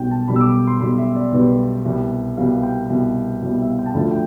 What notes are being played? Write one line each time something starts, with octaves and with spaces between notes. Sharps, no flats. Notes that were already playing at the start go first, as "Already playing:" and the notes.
Already playing: B1 B2 G3 G5
A5
B1 B2 G3 B5
E6
D6
C6
B1 B2 G3 B5
E5
D5
B1 B2 G3 B4
C2 B2 G3
C2 B2 G3 F5
G5
C2 B2 G3
C2 B2 G3
E5
F5
G5
A5
D2 D3 F3 A3 B5
G5